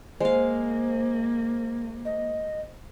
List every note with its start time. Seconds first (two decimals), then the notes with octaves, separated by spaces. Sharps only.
0.20 G#3 A#3 C5 F5
2.05 D#5